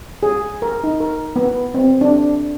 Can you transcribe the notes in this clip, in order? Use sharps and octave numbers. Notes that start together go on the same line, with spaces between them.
G#4
A#4
D#4
A#4
B3
C4
D4